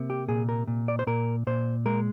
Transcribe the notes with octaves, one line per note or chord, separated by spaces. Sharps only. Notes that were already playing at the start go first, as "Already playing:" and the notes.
Already playing: C3 A#3
G4
A#2 G#4
A#4
A#2
D5
C5
A#2 A#4
A#2 C5
G#3 A#4